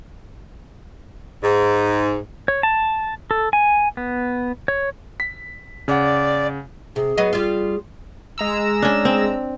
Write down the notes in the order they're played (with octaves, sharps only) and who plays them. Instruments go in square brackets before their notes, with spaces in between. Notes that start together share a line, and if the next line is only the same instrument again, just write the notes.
[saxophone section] G#2
[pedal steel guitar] C#5
A5
A4
G#5
B3
C#5
[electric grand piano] B6
[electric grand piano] C#3 F#5 [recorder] D5
[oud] C3 [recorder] G#4
[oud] F#3 B3 D#5
G3 F4
[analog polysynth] G#3 A#5 E6
[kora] C#4 D4
C4